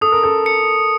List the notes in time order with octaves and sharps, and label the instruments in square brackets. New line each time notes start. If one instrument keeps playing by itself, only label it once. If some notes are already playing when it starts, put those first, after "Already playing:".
[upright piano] A4 [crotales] D#6
[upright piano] A#4
A4
[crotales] C#7